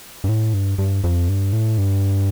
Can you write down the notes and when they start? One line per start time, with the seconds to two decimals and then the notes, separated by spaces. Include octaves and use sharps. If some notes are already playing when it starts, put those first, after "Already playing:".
0.24 G2
0.29 A2
0.54 G2
0.78 G2
1.04 F2
1.29 G2
1.53 A2
1.78 G2